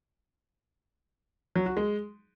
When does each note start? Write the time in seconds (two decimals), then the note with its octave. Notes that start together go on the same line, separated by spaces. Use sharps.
1.55 F#3
1.66 F#4
1.77 G#3